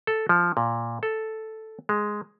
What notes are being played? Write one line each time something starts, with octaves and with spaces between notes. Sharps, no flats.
A4
F3
A#2
A4
G#3